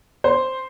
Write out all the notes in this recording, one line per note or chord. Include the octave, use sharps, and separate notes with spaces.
C5